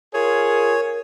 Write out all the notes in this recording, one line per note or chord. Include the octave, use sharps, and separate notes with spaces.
F4 G#4 A#4 C#5